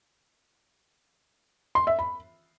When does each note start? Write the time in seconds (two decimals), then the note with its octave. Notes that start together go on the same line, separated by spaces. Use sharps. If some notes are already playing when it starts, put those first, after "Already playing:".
1.75 C6
1.87 E5
1.99 B5